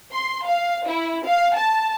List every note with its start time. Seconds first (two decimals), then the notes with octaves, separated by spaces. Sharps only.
0.12 C6
0.47 F5
0.87 E4
1.26 F5
1.57 A5